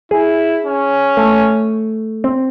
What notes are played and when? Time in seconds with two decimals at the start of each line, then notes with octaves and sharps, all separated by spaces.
0.11 E4 G#4
0.65 C#4
1.17 A3
2.24 C4